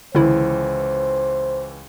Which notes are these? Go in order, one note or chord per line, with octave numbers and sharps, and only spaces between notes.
C#2 D3 E3 E4 C5